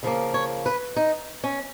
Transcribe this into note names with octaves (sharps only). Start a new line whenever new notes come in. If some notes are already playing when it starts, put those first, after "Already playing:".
C#3 F3 A#3
C#5
B4
D#4
C#4